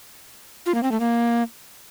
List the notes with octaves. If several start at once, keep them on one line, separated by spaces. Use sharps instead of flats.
F4
A#3
C4
A3
A#3